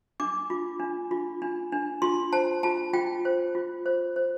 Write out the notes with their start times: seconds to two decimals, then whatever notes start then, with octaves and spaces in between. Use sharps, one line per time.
0.20 D4 D6
0.50 F4
0.80 D4
1.11 F4
1.42 D4
1.72 D4
2.02 F4 C6
2.32 C5 A5
2.63 F4 A5
2.93 F4 G5
3.25 C5
3.55 F4
3.86 C5
4.16 C5